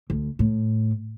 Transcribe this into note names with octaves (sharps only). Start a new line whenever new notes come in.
D2
A2